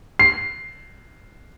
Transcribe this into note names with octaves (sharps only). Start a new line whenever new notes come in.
C7